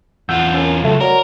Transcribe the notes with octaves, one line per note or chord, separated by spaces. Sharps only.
E2 F4 F#5 E6 G6
C#4 A#4
C#2 F#3 A3
F#3 A#4 D5